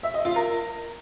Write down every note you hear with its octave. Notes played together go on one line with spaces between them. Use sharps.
E5
D#5
F4
A#4